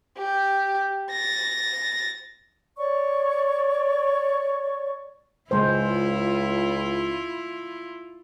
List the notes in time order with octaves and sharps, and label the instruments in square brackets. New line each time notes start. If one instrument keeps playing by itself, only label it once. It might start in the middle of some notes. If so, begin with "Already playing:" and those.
[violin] G4
A6 A#6
[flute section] C#5 D5 C#6
[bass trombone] C#2 [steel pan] C#3 G#3 C5 [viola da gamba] E4 F4